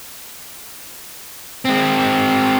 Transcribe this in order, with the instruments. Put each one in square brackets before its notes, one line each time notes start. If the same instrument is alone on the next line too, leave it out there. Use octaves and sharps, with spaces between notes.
[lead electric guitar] G#3 C4